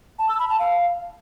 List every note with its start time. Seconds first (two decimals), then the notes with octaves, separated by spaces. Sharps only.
0.19 A5
0.29 E6
0.39 B5
0.49 A5
0.59 F5